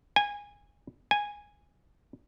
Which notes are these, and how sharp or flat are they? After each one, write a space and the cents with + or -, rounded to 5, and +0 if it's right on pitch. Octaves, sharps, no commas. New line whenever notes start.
G#5 -20
G#5 -10